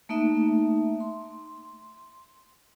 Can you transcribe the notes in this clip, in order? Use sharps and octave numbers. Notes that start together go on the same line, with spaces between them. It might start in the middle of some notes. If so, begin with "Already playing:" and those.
A3 A#3 D#4 E5
C6